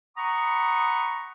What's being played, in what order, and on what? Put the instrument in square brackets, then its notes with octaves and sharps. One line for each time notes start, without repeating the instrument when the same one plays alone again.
[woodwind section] F#5 A#5 B5 C#6 D#6